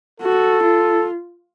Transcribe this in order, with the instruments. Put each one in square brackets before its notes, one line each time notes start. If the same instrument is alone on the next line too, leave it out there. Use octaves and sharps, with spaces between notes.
[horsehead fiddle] F#4 [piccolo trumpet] A4
[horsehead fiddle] F4